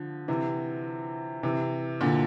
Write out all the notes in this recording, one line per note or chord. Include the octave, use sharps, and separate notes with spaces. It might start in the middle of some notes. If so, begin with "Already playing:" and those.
Already playing: D3 F3
C3 E3
C3 E3
A#2 D3